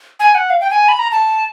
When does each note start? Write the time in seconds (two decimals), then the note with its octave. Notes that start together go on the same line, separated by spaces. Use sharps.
0.20 G#5
0.35 F#5
0.50 F5
0.60 G5
0.71 G#5
0.88 B5
0.99 A#5
1.11 A5